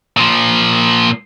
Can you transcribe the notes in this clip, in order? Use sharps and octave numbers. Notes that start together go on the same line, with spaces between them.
A#2 F3